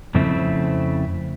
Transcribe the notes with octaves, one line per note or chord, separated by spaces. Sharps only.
F2 C#3 A3 C4 E4